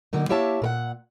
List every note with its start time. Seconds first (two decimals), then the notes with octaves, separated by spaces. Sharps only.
0.13 D3 F#3 A#3 D#4
0.29 A#3 E4 G4 C#5 E5 A5
0.62 A#2 A#4 F#5